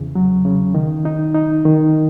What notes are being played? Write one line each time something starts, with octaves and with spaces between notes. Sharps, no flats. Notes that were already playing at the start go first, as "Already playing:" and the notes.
Already playing: E2 C#3
F#3
C#3
D#3
D#4
D#4
D#3